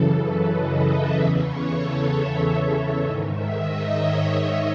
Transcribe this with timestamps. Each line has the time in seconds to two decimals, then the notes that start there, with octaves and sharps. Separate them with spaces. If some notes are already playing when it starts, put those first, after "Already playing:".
Already playing: F#2 C#3 E3 A4
0.16 B4
0.49 D#5
0.81 E5
1.12 E2 C#3 E3 E5
1.44 C#5
1.75 A4
2.06 E5
3.01 G#2 D#3 D#5
3.33 E5
3.65 D#5
3.96 C#5